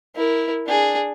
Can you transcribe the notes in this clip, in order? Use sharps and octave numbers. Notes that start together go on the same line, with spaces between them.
E4 A#4
D4 G#4